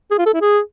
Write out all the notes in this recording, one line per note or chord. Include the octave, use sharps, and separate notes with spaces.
G#4
F4
A4
E4
G#4